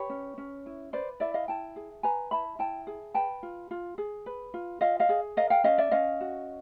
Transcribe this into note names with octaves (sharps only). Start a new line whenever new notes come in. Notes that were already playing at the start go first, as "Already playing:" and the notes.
Already playing: G4 B4 C#5
C#4
C#4
E4
B4 C5 D5
E4 D5 E5
D#5 F5
E4 G5 A5
G#4
B4 G#5 A#5
E4 A5 B5
E4 G5 A5
G#4
B4 G5 A5
F4
F4
G#4
B4
F4
F4 D#5 F5
D#5 F5
G#4
A#4 D#5 F5
F5 G5
C#4 D#5 F5
D5 E5
C#4 D#5 F5
F#4